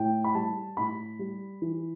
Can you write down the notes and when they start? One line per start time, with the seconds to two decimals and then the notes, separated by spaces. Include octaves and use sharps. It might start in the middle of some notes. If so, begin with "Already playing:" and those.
Already playing: A2 G5
0.24 B5
0.35 G3 A5
0.77 A2 B5
1.19 G3
1.62 E3